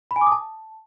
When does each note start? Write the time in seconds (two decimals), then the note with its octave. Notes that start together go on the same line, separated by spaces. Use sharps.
0.11 B5
0.16 G#5
0.21 D6
0.27 D#6
0.32 A5